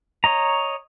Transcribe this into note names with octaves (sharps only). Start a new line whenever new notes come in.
C#5 D#5 A#5